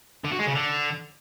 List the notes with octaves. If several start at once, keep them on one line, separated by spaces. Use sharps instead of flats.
D3
F#4
G#3
C#3
D3